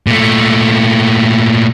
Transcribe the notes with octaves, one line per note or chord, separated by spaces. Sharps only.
A#2 A3